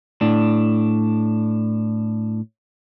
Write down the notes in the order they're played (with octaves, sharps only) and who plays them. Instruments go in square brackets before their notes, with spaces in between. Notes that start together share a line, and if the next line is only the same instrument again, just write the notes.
[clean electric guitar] A2 D4